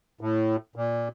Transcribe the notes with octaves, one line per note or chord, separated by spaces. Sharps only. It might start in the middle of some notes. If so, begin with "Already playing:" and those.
A2
A#2